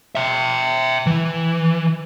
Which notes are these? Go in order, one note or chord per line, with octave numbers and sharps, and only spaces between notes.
E5 G5
E3